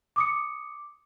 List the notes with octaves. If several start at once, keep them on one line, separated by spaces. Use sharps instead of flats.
D6 D#6 C#7